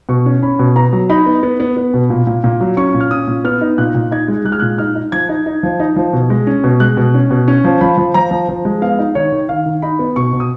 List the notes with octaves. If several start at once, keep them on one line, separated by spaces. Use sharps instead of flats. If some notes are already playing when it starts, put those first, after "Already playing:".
B2 C#6
C#4
C#4 B5
B2
B3 A#5
F#3
D#4 B5
B3
B3
B3
B3
B2
A#2
A#2
A#2
F#3
C#4 C#6
A#2
F6
C#4 D#6
A#2
B3 F6
D#4
A#2 F#6
A#2
D#4 G#6
G#3
G#3 F#6
F6
A#2 F#6
D#4 F6
D#4
F3 G#6
D#4
D#4
F3
D#4
F3
B2
G#3
C#4
B2
G#3 F#6
B2
C#4
B2
C#4
F3
F3 B5
F3
F3 A#5
F3
F3
G#3
B3 F5
D#4
D#3 C#5
D#3
D#3 F5
D#3
D#4 B5
B3
B2 C#6
B2
D#6